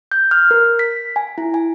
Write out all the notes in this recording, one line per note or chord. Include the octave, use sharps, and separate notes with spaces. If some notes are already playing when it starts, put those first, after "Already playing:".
G6
F6
A#4
B6
G#5
E4
G#5